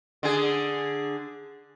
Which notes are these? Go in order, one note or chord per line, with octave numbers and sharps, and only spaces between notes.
D3 G#4